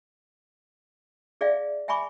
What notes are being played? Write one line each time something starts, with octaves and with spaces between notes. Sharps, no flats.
G#4 D5 E5 F5 G5
E5 G5 G#5 B5 C#6 D6